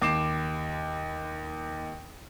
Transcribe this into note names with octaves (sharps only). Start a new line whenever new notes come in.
D#2 D6 C7 E7